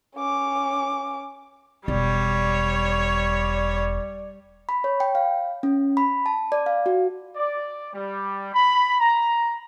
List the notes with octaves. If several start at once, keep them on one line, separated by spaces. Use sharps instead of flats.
C#4 D6
E1 G3 C#5 D5
B5
C#5
G5
F5
C#4
B5
A5
D5
F5
F#4
D5
G3
B5
A#5